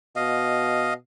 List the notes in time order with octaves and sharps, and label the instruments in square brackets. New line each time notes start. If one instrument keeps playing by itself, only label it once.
[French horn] B2 [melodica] D#5 F5